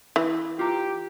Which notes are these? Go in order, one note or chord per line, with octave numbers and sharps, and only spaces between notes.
E3
F4 G4 A#5